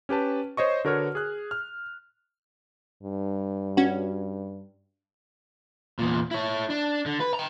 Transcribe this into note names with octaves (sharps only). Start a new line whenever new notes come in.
C#4 G4 B4 A5
C5 C#5 D#5 C#6
D3 F#4 A#4 B4 C#5 F6
G#4 F#6
F6
G2
C#4 F#4
E2 A#2
E4 C#5
D4
D3
B4
G5 A#5